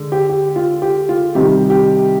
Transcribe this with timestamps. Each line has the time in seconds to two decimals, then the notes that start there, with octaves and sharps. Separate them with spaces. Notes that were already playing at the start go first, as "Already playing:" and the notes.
Already playing: D3 G#3
0.12 G4
0.29 G4
0.56 F4
0.82 G4
1.09 F4
1.35 C3 D#3 G3 G4
1.70 G4